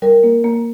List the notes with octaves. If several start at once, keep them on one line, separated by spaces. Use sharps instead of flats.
G3 A#4
A#3
A#3